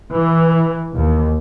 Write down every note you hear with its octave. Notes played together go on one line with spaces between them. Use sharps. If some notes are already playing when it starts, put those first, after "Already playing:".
E3
D#2